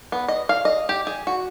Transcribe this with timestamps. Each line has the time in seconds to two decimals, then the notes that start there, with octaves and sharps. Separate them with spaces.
0.12 B3
0.28 D#5
0.49 F5
0.65 D#5
0.89 G4
1.07 G#4
1.27 F#4